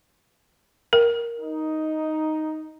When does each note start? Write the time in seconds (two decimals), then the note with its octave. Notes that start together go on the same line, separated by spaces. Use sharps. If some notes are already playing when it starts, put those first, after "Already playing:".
0.93 A#4
1.40 D#4